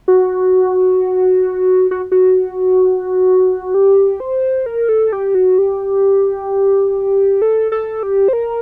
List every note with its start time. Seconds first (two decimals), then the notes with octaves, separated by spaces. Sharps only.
0.08 F#4
1.91 F#4
2.12 F#4
3.74 G4
4.20 C5
4.66 A#4
4.89 A4
5.12 G4
5.35 F#4
5.58 G4
7.42 A4
7.72 A4
8.03 G4
8.28 C5
8.33 A#4